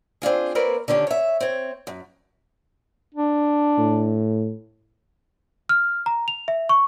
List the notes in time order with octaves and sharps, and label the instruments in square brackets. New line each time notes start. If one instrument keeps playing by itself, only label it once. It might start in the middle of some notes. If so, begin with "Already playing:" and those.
[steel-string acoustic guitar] C4 D4 F4 G#4
A#3 C4 A#4 B4 C#5 D5
D3 D#3 C#4 D4 G4
C#5 E5
C4 C#5
F#2
[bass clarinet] D4
[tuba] A2
[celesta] F6
A#5
F7
E5
C#6